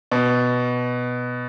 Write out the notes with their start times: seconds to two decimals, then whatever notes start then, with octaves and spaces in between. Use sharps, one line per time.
0.12 B2